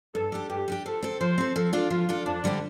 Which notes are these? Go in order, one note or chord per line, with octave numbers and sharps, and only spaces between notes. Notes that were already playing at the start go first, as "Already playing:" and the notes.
G2 A4
G3 D4 G4
G2 G4
G3 D4 G4
F3 A4
C4 A4
F3 C5
C4 A4
F3 A4
D4 F4 A4
F3 F4
D4 F4 A4
F2 D4
D3 G3 C4 G4